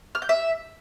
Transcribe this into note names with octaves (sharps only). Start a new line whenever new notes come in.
F6
G6
E5